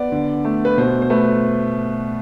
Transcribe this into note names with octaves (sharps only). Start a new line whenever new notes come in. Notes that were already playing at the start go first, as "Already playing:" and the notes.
Already playing: B3 D5
D3
A3
B4
B2 C5
C5
A3 B4